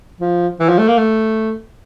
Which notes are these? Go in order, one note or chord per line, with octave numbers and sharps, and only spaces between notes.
F3
E3
F3
A3
A#3
A3